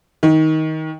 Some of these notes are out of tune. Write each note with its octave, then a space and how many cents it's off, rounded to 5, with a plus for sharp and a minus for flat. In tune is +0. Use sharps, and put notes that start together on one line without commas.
D#3 +15